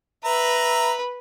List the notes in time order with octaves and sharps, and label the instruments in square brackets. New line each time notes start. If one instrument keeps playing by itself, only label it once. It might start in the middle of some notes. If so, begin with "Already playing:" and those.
[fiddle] B4 [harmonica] E5 A#5